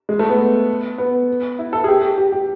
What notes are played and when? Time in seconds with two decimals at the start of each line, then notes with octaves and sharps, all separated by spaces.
0.09 G#3
0.19 A3
0.29 B3
0.98 B3
1.59 E4
1.73 A4
1.84 G#4
1.88 G4
2.18 G4
2.32 G4